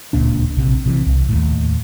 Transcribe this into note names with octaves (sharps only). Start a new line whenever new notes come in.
D1 C#2 A#2 D4
A#1 C3
C3 D#3 E3
C2
D#2 A2